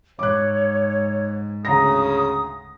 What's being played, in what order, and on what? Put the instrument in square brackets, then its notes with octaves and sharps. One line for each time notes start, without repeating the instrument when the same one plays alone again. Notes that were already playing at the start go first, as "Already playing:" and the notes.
[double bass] G#2 [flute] C#5 [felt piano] D6 F#6
[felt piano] D2 A#5 A#6 [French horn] C#3 [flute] D#6